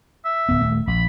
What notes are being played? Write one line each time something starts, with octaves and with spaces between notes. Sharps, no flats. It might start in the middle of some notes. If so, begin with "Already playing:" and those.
E5
D1 B3
D#1 A3
A#1 B5